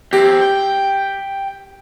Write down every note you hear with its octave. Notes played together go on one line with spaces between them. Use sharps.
E2 C4 G4
G5